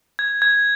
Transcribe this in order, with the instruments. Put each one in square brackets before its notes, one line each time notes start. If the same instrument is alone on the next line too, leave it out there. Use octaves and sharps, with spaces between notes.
[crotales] G#6
G#6